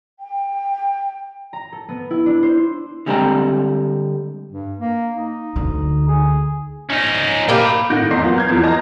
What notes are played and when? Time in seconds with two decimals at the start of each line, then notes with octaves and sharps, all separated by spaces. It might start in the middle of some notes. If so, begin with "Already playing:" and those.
0.20 G5
1.53 A#5
1.73 A4
1.89 B3
2.11 E4
2.26 D4
2.43 C5
3.06 D3 G3 G#3 C4 G5 A#5
4.52 G2
4.78 A#3
5.16 D#4
5.56 D2 D3
6.09 G#4
6.90 C#4 D#4
7.49 A#3 G4 A4 B5
7.90 A2 D#3 F#5 G6 A#6 D7
8.10 E2 D#5 C6 C7
8.23 F#3 A#3 B3 F4
8.36 F6 G6 G#6
8.49 E2 E3 F3
8.63 D#5 A5 A#5